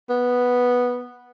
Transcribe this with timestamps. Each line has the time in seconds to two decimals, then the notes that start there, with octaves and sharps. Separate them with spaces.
0.09 B3